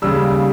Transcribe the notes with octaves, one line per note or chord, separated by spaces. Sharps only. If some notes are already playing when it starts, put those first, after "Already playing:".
D#2 C#3 G3 E6